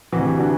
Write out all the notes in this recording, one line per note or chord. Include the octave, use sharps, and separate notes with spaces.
D2 C3 E3 F#4
G4
D4 F#4